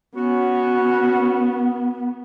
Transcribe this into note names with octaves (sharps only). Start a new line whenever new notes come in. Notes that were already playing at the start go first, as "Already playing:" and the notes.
B3 C#4 F#4